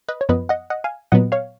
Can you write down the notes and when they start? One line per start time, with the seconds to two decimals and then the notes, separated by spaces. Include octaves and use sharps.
0.08 B4 D#5
0.21 C#5
0.29 F#2 F3 B3 B4 D#5
0.49 D#5 F#5
0.70 D#5 F#5
0.84 F5 G#5
1.12 A#2 F#3 B3 D#5 F#5
1.32 C#5 F5